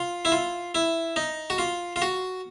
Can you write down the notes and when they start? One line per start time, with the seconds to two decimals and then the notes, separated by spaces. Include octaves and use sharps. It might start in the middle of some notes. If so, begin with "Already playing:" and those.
Already playing: F4
0.25 E4
0.32 F4
0.75 E4
1.16 D#4
1.50 F#4
1.58 F4
1.96 F4
2.02 F#4